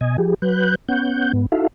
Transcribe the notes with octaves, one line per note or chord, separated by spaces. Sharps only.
B2 D#5 G#5
F3 G4 G#4
F#3 B4 F#6 G6
B3 C#4 F#5 G6
G#2 B3
D#4 E4 F#4 A4 E5 F5